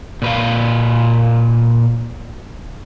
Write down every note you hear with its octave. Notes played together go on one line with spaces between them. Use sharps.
A#2 B4 F5